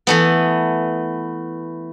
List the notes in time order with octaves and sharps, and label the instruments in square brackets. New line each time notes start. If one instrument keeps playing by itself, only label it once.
[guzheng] E3 A3 B3